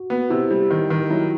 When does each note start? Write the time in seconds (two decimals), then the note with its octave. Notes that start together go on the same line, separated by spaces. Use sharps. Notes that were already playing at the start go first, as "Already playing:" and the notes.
Already playing: F#4
0.10 B3
0.30 C3 E4
0.51 G3
0.71 D#3
0.90 D#3
1.10 F#3 E4